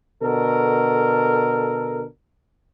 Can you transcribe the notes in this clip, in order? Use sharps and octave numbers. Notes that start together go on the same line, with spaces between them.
B2 D3 A4 A#4